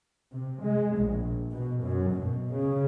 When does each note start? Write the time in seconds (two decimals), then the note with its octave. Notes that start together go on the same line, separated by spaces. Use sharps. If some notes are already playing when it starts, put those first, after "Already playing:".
0.32 C3
0.64 G#3
0.99 A#1
1.51 B2
1.83 F#2
2.14 B2
2.54 C#3